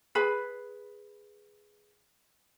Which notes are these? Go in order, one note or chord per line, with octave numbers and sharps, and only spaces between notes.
G#4 B4 B5